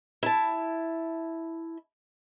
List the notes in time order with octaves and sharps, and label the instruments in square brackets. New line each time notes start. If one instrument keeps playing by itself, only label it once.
[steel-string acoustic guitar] E4 A5